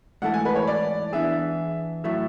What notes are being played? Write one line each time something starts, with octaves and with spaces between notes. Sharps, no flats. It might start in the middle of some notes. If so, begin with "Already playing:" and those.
G#2 E3 A3 E4 A4 F#5
G#5
B4
C#5
D5
E3 B3 D4 G#4 E5
A2 F#3 A3 E5